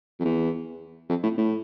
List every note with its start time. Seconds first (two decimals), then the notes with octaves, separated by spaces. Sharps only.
0.20 F2
0.24 E2
1.09 F2
1.23 A2
1.38 A2